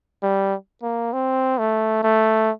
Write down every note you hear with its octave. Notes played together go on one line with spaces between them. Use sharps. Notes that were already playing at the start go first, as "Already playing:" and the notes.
G3
A#3
C4
A3
A3